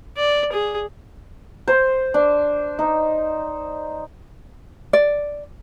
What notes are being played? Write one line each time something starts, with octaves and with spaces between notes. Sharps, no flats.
D5
G#4
C5
D4
D#4
D5